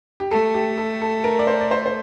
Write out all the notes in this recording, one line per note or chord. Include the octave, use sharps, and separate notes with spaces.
G4
A3 A4
G4
A4
A4
A#4
D5
C5
D5
C5
C5